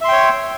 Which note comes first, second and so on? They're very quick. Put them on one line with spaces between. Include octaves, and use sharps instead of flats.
E5 C6 G5 C#5